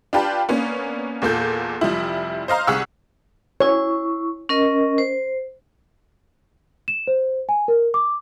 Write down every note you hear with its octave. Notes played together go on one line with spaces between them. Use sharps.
D4 F4 G4 B4 G5 A5
A#3 B3 C#4 D4
E2 A#2 A#3 A4 G6
F1 F3 G3 E4
C5 D#5 F5 A#5
C2 G#4 F#5 C#6 E6 F6
E4 C#5 C#6
C#4 A#4 D#5
C5
E7
C5
G#5
A#4
D6